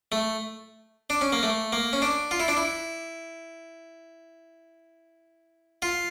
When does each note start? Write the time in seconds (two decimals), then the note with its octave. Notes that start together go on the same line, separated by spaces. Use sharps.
0.12 A3
1.10 D4
1.21 C#4
1.32 A#3
1.43 A3
1.73 A#3
1.93 C#4
2.02 D4
2.31 F4
2.40 E4
2.48 D4
2.57 E4
5.82 F4